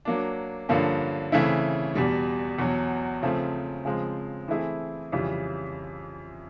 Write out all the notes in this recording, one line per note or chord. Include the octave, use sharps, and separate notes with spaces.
F#3 A#3 D4
G2 D3 F3 A#3 C#4
C#3 E3 A3 C4 E4
E2 B2 G3
E2 B2 F#3
C#3 F3 A3 C4
C#3 F3 G#3 C4
E3 A3 C4 E4 G#4
F2 C#3 E3 G3